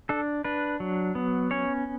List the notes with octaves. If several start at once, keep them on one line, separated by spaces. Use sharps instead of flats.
D4 A4
D4 B4
F#3
B3
C#4 C#5